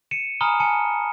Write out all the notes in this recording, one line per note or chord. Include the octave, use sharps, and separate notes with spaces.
C#7 D#7 E7
G#5 A#5 B5 D#6 F6 G7
G#5 A5 C#7